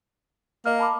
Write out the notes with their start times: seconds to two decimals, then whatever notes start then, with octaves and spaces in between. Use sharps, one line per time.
0.66 A#3 A#4 D#5 F6
0.79 A5 B5 D6